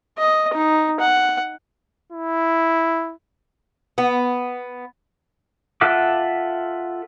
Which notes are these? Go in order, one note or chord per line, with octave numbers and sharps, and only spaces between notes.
D#5
D#4
F#5
E4
B3
F4 A4 E5 F#5 D6